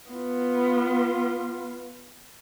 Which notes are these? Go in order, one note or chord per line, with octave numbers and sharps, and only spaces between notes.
B3 F4